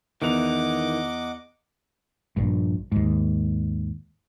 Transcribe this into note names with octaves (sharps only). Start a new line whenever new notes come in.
E2 D#3 E3 D#5 F#5 D6 F7
A#1 G2
D#2 G#2